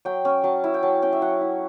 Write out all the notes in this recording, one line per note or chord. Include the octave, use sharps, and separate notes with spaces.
F#3 G5
C#4
F#3 A5
E4
G5
F#3 A5
C#4 G5
E5
F#3 F#5
E4